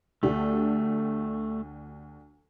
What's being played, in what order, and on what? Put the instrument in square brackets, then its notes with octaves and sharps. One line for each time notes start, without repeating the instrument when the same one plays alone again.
[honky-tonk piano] D2 D4 G4 [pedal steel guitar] A3